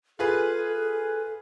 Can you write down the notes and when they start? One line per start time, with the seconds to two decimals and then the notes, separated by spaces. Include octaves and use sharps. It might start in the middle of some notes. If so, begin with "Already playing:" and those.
0.19 F4 G#4 A4 B4